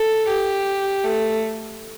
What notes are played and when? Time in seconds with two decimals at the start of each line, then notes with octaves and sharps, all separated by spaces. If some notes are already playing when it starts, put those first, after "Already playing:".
Already playing: A4
0.27 G4
1.04 A3